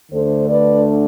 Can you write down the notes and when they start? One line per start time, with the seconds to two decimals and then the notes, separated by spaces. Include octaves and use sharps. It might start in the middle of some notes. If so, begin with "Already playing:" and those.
0.12 D2 D3 A3 D4 A4 C5
0.50 B4 D5